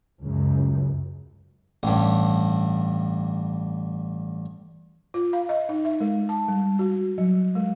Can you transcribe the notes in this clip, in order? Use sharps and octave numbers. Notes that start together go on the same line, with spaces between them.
C#2 F#2
A1 G2
F4
F5
D#5
D#4
E5
G#3
A5
G3
F#4
F#3
G#3